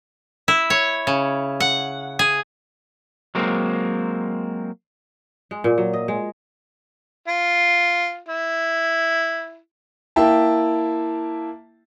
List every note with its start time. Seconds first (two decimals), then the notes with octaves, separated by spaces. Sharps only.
0.48 E4
0.70 C#5
1.07 C#3
1.60 F#5
2.19 G#4
3.35 F#3 G#3 A#3 C4
5.51 G#3
5.64 A#2
5.78 F#3
5.93 D#5
6.08 G#3
7.28 F4
8.29 E4
10.16 A#3 E4 E5 G5 A5